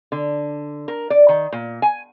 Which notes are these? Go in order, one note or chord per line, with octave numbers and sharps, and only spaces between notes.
D3
A#4
D5
D#3
A#2
G#5